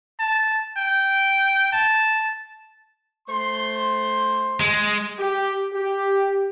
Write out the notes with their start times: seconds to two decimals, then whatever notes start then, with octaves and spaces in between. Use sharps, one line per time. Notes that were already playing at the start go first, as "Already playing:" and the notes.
0.19 A5
0.77 G5
1.73 A5
3.28 A3 C5 C6
4.60 G#3
5.19 G4
5.73 G4